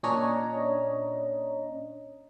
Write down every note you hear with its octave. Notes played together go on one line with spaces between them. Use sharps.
A#2 C#4 D4 C#5 D#5 A#5